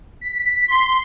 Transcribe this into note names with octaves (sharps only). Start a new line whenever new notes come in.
B6
C6